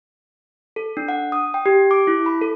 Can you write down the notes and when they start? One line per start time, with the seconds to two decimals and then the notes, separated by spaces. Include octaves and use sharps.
0.76 A4
0.97 D4
1.08 F#5
1.32 D#6
1.54 G5
1.66 G4
1.91 D6
2.07 E4
2.26 B5
2.41 A4